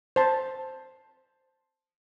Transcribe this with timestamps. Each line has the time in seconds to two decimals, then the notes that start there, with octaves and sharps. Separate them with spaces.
0.16 C5 A5